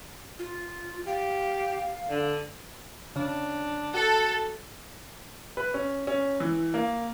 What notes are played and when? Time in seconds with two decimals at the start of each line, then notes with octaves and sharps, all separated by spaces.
0.39 F4
1.07 G4 F5
2.08 D3
3.16 C#3 D4
3.94 F#4 A4
5.57 B4
5.74 C#4
6.07 C#4
6.40 E3
6.74 A#3